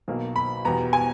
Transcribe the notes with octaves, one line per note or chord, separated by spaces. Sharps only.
B1 B2 A#3
B5
E2 B2 G3 B3 A#5
G#5